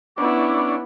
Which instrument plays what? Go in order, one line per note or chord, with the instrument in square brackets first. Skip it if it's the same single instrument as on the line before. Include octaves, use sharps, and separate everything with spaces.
[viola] B3 E4 [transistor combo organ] C#4 D4 [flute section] D6